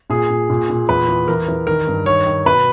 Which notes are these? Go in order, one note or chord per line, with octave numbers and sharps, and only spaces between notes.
A#2 G#4
A#2
A#2
A#2
E2 B4
E3
E3 A#4
E3
D#3 A#4
G2
D#3 C#5
D#3
B2 B4